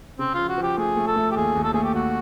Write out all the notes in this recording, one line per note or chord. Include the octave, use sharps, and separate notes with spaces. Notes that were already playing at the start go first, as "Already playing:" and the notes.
C#3 C4
F3 F4
F#4
F3
G4
A3 G#4
A3
A4
A3
G4
D#2 G#4
D#2
A4
A3 G#4
G4
D#2 F#4